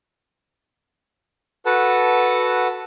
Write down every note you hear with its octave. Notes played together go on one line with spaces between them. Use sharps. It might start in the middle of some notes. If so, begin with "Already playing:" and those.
F#4 A4 B4 F#5 A5